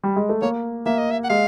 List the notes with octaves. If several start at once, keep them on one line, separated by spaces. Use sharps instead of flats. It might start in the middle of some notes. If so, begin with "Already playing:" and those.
G3
G#3
A3
A#3 C#5
A#3 E5
D#5
E5
F#5
G#3 F5